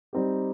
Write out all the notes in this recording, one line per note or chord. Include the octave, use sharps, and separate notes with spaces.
G3 C4 D#4 G4